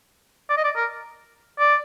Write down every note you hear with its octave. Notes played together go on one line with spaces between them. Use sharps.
D5
D#5
D5
A#4
D5